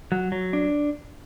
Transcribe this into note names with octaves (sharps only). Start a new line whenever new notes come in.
F#3
F#3
D4